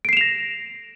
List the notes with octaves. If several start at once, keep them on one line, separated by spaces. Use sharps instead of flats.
A#6 C7 D7 E7 F7